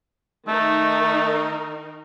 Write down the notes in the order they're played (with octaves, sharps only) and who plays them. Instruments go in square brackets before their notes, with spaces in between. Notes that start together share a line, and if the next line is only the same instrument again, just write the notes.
[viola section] D#3 D#4 A#4 [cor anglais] A3